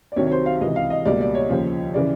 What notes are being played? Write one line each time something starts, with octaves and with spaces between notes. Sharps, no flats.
D5
C2 C3 D#3 F#3 C#5
C#5
C5
F5
C#2 C3 E3 D#5
F5
D#5
C#2 B2 G3 A#3 D5
D5
C#5
D#2 C#3 F3
C#3 E3 D5